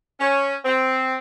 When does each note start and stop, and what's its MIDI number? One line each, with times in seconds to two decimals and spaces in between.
0.20 0.55 61
0.65 1.16 60